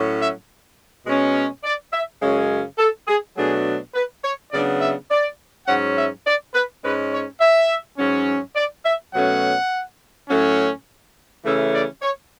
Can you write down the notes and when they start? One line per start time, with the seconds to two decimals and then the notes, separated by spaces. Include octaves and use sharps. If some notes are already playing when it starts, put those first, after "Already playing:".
Already playing: A2 F#3 C#4
0.19 E5
1.05 B2 G#3 C#4
1.64 D5
1.92 E5
2.20 F#2 C#3 G#3 C#4 C#5
2.78 A4
3.07 G#4
3.36 B2 F#3 A3 D4 G#4
3.93 B4
4.23 C#5
4.52 C#3 F#3 B3 D4 D5
4.80 E5
5.10 D5
5.67 G#2 F#3 C#4 F#5
5.96 E5
6.25 D5
6.53 B4
6.82 G#2 G#3 C#4 B4
7.11 C#5
7.40 E5
7.98 G#2 F#3 C#4
8.56 D5
8.84 E5
9.13 B2 F#3 A3 C#4 F#5
10.29 A2 F#3 A3 C#4
11.43 C#3 E3 A3 C#4 E5
11.73 D5
12.01 C#5